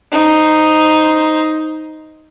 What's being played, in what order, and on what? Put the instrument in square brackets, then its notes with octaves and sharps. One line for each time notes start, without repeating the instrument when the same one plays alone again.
[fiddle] D#4 C5